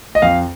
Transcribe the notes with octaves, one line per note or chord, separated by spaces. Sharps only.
D#5
F2 F5